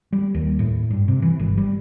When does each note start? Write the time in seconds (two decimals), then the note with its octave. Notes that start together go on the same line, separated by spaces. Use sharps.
0.13 G3
0.35 D#2
0.59 A2
0.91 G2
1.08 C3
1.22 E3
1.40 G1
1.58 G3